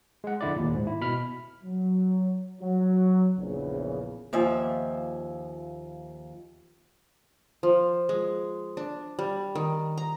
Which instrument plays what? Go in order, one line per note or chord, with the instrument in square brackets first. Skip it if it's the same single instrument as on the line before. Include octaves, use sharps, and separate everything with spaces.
[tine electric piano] G#3 F#5
F2 D3 E4 D5
D#2 A#2
G#2
E4
B2 B5 F6
[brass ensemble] F#3
F#3
A#1 E2 C#3
[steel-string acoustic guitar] D#2 F3 E5 G#5
[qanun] F3
G#3
D4
G3
D#3
A#5